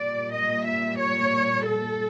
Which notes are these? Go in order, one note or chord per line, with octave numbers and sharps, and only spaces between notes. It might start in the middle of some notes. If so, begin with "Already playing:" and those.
Already playing: A#2 G3 A#3 D5
D#5
E5
C#5
A4